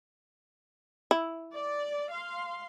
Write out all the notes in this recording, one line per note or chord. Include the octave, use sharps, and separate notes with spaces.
E4
D5
F5 C6